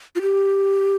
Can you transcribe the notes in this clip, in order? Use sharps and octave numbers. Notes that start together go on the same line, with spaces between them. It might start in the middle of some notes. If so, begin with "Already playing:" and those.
F4
G4